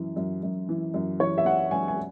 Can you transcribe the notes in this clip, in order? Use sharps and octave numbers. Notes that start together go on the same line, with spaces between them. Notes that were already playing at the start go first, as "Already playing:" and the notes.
Already playing: F#2 E3
F#2
F#2
E3
F#2
E3 C#5
E5
E3 F#5
F#2 G#5
G#5